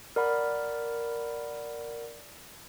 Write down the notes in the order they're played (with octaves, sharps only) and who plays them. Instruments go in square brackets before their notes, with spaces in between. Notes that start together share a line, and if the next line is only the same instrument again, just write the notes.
[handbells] A#4 D5 F#5 B5